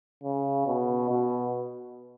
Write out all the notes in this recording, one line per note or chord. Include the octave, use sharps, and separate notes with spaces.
C#3
B2
B2